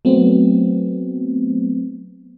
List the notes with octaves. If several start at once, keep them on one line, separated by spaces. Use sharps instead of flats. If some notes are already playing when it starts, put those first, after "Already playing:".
F#3 A3 B3 C4